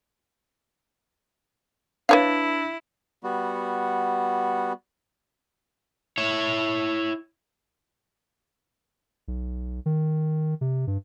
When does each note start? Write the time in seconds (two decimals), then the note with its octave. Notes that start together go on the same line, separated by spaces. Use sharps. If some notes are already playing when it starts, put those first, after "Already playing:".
2.09 D4 E4 B4 C#5 F5
3.24 G3 B3 F#4
6.18 E4 C#5
9.28 B1
9.86 D#3
10.61 C3
10.87 G2